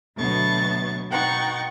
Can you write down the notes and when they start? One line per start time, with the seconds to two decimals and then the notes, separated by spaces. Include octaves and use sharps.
0.17 D2 B2 F#3 B3 C#6 A6
1.11 B2 D#4 F#5 G5 C#6 A6